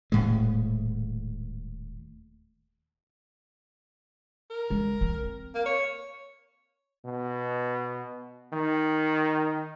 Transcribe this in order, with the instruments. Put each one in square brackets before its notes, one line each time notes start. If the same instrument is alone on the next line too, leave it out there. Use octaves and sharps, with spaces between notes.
[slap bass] D#1 A2 G#3
[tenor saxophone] A#4
[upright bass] G#3
C4
[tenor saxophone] A#3
C#5
[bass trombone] B2
D#3